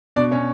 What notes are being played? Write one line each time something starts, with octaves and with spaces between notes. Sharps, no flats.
B2 D4 D5
B2 C#4 C#5